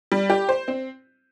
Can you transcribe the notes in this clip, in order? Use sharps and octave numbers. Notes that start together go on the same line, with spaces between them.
G3
G4
C5
C4